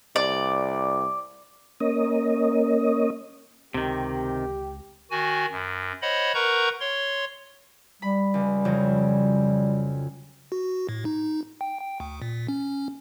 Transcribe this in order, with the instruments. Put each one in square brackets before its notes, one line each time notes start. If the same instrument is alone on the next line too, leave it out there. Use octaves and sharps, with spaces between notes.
[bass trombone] C2 [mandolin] D5
[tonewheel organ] A#3 C#4 D#5
[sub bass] C#2 [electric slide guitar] C3 D#3 [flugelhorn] G4
[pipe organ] D#3 F#4 G#5
F#2
C5 C#5 D#5 F#5 B5
A#4 B4 F#5 A#5 C#6 G6
C#5 C6
[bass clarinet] G3 [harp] B5
[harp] C#2
F2 C#3 F#3
[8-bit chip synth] F#4
A2
D#4
G5
G5
D2
A#2
C#4